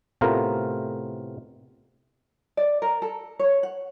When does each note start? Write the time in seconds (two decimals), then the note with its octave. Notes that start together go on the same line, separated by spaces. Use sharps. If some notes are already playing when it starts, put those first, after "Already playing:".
0.21 A2 C3 A3 B3 F4 A#4
2.57 D5
2.82 A#4
3.02 A4
3.39 C#5
3.63 F#5